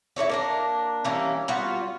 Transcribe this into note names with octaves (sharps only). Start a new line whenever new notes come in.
E4 G#4 C#5 D5
A#3 D4 A#4
E3 G3 A#3 C#4
G3 B3 F4 F#4